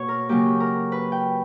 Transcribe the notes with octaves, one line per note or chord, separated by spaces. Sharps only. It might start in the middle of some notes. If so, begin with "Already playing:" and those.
Already playing: B2 A#3 C#5
A#4
C#3 F#3 A#3 G4
A#4
B4
G5